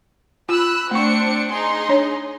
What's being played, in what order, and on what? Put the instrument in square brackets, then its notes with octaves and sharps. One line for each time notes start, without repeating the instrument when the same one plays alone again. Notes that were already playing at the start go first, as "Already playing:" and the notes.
[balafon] F4 [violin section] B5 E6 F#6
[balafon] A3 C#6 [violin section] C4 D4 C#7
[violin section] D#4 G#4 C6
[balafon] D4 C#5